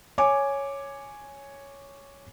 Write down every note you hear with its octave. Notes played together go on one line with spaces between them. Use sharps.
C#5 G#5 D6